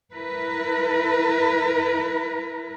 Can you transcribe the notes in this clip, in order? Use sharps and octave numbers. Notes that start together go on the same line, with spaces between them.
E4 A#4 B4